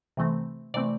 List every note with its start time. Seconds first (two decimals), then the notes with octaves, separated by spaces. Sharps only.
0.17 C3 E3 A3 C4
0.74 C3 E3 A3 C4 D5